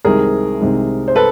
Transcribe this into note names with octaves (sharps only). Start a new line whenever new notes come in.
C2 C3 D#3 G#3 G#4 A#4
C2 C3 D#3 G#3
C5
A4 B4